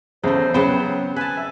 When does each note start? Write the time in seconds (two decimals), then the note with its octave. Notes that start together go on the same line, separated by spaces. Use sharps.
0.24 E2 C#3 A3 C5
0.54 C#3 F#3 B3 C5 G5
1.16 B4 G#5 A5
1.37 E5